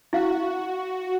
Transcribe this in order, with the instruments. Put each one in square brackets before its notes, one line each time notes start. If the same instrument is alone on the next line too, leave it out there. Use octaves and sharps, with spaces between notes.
[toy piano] E4 F5 [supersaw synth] F#4